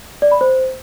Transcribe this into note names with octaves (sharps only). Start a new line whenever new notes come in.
D5
B5
C5